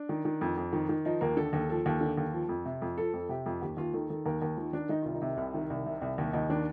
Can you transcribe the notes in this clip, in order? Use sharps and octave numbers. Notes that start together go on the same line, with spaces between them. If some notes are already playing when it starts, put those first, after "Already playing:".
Already playing: D4
D#3
D#3
F2
F2
D#3
D#3
F3 D#4
D#2 A#3
D3 A4
D#2 A4
F3 A4
D#2
D3
D#2
F3
F2
C3
F2
F3 A4
F2
C3 G4
F2
D#2 G4
D#2 F4
D#3 A4
D#3 A4
D#2 A#4
D#2 A#4
D#3 F4
D#3 D4
D#3 D#4
C2 F4
D#4
C3
C2
D#3
C2
C3
C2
D#2
D#2 D#4
D#3 D4